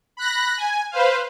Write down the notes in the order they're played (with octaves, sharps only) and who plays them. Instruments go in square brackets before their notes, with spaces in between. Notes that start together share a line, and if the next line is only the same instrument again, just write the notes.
[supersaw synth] B5 F#6 A#6
G#5
B4 C5 F5